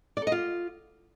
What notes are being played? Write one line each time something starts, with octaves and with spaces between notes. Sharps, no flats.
D5
A4
D#5
F4